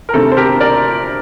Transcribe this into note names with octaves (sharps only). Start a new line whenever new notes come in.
A#4
D2 C3 D#3 A3 C4 A4
C5
G4 A#4
A#4 D5